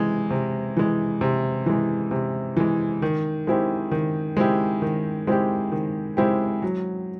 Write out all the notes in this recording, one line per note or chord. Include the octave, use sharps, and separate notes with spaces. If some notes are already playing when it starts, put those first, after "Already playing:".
Already playing: C3 E3 G#3
C3
E3 G#3
C3
E3 G#3
C3
E3 G#3
D#3
G#3 C4 E4 G4
D#3
G#3 C4 E4 G4
D#3
G#3 C4 E4 G4
D#3
G#3 C4 E4 G4
F#3